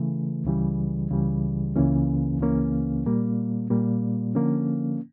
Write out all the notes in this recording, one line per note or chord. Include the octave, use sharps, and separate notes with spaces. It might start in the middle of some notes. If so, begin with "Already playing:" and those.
Already playing: C#3 E3 A3
C#2 C#3 E3 G3
C#2 C#3 E3 G3
C#2 C#3 E3 A#3 C#4
C#2 C#3 E3 A#3 C#4
A#2 G3 A#3
A#2 G3 A#3
D3 F3 A#3 C#4